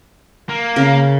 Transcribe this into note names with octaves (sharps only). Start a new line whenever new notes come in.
A#3
C#3 A#4